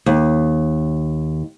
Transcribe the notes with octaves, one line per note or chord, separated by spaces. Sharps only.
D#2